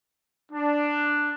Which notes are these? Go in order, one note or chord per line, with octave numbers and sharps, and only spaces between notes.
D4